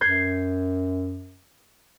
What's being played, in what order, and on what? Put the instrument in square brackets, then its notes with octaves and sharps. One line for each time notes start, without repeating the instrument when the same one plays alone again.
[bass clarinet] F#2 [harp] G6 G#6 C7